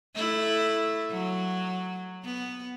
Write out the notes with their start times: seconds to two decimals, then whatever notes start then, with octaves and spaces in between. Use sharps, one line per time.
0.16 A3 E4
1.11 F#3
2.24 B3